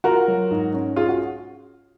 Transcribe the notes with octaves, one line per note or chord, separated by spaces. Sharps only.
F4 F#4 A#4
F#3
G#2
C#4
F4 G#4
F#4